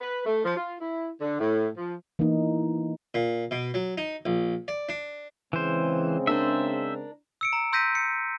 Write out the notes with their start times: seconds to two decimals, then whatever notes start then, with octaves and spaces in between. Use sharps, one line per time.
0.01 B4
0.26 A3
0.45 F3
0.57 F4
0.80 E4
1.21 D3
1.40 A2
1.77 F3
2.19 E3 A#3 B3 D#4
3.14 A#2
3.51 B2
3.74 F#3
3.98 D#4
4.26 A#1
4.68 D5
4.89 D4
5.53 C#3 E3 G#3 C4 C5
6.27 D4 A#4 C5 E5
7.41 E6 C#7 D7
7.53 A#5
7.72 C6 E6 G6 A#6 B6 D#7
7.95 C#7